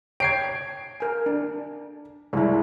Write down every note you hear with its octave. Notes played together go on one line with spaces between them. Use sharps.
C#5 G5 G#6 C7 D7
A#4 G#5
D4
C2 G#3 E4